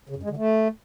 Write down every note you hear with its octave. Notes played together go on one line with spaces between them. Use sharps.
C#3
F#2
G#3
D3
A3